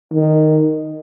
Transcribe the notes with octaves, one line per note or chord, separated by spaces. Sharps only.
D#3